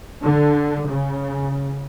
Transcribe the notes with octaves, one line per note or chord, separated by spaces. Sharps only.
D3
C#3